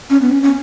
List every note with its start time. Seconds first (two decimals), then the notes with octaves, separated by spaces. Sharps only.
0.10 C#4
0.21 B3
0.31 C#4
0.43 C#4